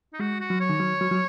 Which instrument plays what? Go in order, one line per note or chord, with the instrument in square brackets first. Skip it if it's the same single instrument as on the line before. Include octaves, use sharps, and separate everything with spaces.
[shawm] D#4
[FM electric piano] G#3 [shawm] F#4
[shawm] F#4
[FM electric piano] F#3
[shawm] C#5
[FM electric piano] D#3
F#3
F#3
F#3